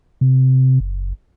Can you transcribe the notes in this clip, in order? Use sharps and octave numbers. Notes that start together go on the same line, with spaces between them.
C3
F#1